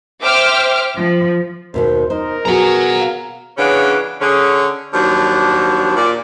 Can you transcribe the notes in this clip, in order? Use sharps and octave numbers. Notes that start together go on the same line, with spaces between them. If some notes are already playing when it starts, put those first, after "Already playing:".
C5 E5 G5 D6 F6
F3
D#2 B2 D#3 C5
D#4 A#4 C5
B2 B3 F#4 G#4 F#5 A#5
F5
C#3 E3 B3 C#4 D4 F5
D3 C#4 G#4
D#2 F3 F#3 D4
A#2 D5